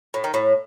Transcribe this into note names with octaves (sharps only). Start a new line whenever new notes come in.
A2
D#3
A2